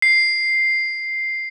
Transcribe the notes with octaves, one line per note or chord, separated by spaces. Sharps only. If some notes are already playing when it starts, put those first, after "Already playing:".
C7